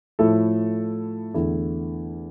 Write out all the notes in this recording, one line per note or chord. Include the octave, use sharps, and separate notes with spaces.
A2 F3 A3 E4 A4
E2 D3 A3 E4